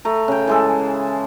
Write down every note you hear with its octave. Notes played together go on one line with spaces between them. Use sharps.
A3 A#5
C#3 G5
E3 G#3 A4